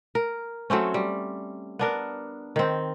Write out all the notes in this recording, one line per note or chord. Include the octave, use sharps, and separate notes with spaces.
A#4
F#3 A3 C4 C#4
G3
B3 D4 A#4
D#3 C4